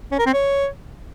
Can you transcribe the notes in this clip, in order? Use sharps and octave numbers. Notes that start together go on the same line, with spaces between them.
C#4
A#4
C4
C#5